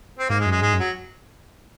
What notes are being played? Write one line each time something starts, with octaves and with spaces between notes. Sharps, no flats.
C4
G#2 A#3
G#3
F#2
G#3
G#2 G#3
F#2
F#3